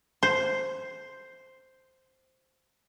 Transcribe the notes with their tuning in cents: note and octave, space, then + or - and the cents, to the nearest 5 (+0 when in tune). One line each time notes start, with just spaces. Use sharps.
C5 +0